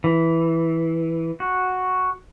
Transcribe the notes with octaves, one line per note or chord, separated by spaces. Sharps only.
E3
F#4